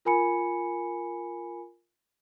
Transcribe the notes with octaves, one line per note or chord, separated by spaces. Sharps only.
F4 A#4 G#5 B5 C#7